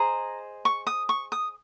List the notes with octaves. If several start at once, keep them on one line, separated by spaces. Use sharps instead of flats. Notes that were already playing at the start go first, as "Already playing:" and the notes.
Already playing: G#4 C5 D#5 A#5
C#6
D#6
C#6
D#6